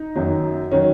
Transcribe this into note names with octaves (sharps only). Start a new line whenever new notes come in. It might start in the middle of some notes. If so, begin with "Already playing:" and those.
Already playing: D#4
F#2 D#3 F#3
D#3 F#3 C#4